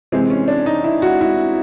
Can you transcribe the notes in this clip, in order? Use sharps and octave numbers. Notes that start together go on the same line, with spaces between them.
C3 E3 G#3 C4
C#4
D4
D#4
E4
F#4
E4